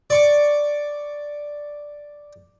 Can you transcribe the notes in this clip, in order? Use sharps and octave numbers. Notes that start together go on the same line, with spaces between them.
D5 C#6 D6